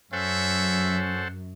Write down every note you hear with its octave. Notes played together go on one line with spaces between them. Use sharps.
F#2 C#4 A4 C5 E5 F#5